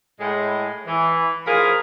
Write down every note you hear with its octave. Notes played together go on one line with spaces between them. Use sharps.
A2 G#3
E3
A2 F3 G#4 A#4 F5 B5